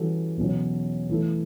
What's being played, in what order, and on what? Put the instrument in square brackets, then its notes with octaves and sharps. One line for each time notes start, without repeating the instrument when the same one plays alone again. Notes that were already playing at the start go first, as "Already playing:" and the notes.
Already playing: [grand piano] E3 G3 C#4 F#4 A4
E2 B2 F#3 C#4
E3 A3 E4 A4